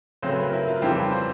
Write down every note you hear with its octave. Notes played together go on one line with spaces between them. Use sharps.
C#3 F#3 A3 C4 C5
B4
A#4
E4
F4
F2 C#3 E3 G3 C4 G4
B4
C5